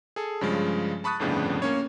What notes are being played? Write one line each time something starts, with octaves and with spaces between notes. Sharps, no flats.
G#4 A4
G2 C#3 F3 G#3
A5 B5 C#6 D#6 F#6 A6
G1 F2 A2 C#3 B3 D4
A#3 C#4 C#5